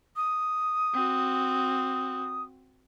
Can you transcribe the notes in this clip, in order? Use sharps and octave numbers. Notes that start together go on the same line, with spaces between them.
D#6
C4 F#4